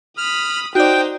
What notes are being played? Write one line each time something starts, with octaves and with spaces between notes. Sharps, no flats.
B5 D#6 F6
D#4 F#4 C5 D5 G5